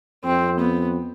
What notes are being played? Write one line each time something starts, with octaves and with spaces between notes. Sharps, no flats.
F2 C4
B3